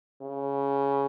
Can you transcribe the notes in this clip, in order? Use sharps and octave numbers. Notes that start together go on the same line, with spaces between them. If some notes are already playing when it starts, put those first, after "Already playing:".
C#3